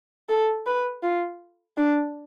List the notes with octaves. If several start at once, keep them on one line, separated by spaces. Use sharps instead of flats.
A4
B4
F4
D4